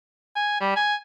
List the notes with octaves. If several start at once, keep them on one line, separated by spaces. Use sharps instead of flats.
G#5
G3
G#5